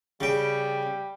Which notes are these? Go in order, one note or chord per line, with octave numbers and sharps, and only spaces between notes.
C#3 G3 G5